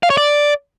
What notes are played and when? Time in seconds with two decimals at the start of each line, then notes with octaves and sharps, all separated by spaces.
0.03 F5
0.10 C#5
0.17 D5